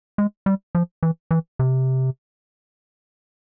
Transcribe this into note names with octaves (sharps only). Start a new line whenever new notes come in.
G#3
G3
F3
E3
E3
C3